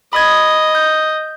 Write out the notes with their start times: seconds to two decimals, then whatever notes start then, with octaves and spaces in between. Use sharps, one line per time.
0.13 D#5 B5 D#6 G#6
0.75 G6